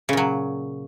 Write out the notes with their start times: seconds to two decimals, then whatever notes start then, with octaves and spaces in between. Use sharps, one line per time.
0.09 C#3
0.13 A#2
0.17 F#3